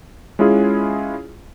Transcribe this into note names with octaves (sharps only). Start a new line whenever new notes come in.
G#3 C#4 E4 F4 G#4